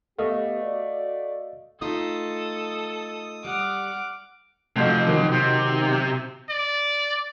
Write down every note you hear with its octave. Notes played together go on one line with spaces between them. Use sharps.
A3 B3 G4 D#5 F5
F#4 D5
A3 D#4 F4 A4 D#6
G3 F#5 D6 F6
C3 F3 A3 F#4 D#5
D#3 F#3 D#4
C3
D5